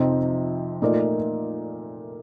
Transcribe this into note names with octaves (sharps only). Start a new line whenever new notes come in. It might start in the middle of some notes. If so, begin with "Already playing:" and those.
Already playing: F2 C3 F3 C4 D#4
A#2 A3 D#4 A#4 D5